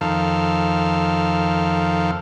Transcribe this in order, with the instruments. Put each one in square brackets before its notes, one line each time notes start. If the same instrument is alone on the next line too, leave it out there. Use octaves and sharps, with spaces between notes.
[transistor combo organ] F2 D#3 A4 F5